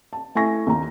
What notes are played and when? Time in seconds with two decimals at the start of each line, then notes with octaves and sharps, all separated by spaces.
0.13 A5
0.35 A3 E4 G#5 C#6 A#6
0.67 D#2 A#5